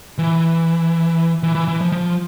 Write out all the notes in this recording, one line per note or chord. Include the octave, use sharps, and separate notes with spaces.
E3
E3
E3
E3
F3
F3